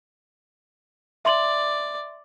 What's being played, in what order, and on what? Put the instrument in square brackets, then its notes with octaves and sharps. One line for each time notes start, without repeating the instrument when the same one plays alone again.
[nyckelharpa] D5 [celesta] E5 C6 F#7